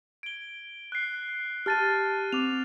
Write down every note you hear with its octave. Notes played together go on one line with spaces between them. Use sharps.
G#6 D7 G7
F#6 C7
G4 A5 F6 A6 D#7
C4 D6 F7